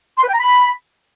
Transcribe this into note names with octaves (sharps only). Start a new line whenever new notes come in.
C6
B4
G5
A#5
B5